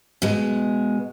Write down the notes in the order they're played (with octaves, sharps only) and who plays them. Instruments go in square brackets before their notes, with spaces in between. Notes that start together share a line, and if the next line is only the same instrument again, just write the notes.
[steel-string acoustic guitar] B2 G#3